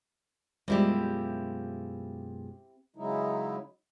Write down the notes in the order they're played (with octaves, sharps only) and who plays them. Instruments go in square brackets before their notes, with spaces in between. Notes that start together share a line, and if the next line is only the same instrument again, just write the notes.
[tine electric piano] F#2 B2 [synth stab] G3 [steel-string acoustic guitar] G#3 F4 [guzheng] C4 E4 G4
[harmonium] C#3 F#3 G#3 D#4 E4